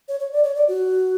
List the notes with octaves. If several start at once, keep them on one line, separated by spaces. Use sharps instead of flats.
C#5
C#5
D5
C#5
D5
F#4